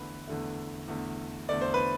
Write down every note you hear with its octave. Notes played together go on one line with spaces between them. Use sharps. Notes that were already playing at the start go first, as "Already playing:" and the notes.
Already playing: E2 D3 A3 B4
E2 D3 A3
E2 D3 A3
E2 D3 A3 D5
C5
B4